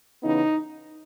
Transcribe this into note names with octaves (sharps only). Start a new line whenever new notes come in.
C#3 E3 B3 D#4